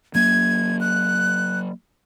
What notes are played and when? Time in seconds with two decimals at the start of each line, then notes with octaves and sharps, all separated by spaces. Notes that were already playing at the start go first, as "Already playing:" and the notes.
0.15 F#3 A#3 G#6
0.80 F#6